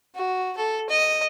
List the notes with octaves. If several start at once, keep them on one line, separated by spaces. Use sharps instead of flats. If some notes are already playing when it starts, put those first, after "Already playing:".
F#4
A4
D#5